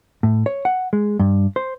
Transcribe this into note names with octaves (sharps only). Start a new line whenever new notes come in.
A2
C#5
F#5
G#3
G2
C5